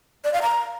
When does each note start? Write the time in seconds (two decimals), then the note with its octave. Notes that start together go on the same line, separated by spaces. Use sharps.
0.24 D5
0.33 F5
0.42 A#5